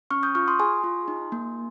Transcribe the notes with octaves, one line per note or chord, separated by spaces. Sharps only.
C#4 C#6 F6
D#6 G6
F4 C#6 F6
C6 D#6
G#4 G#5 C6
F4
D#4
A#3